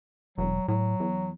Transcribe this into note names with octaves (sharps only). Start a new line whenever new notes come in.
E1 F#3
A2 F#3
E2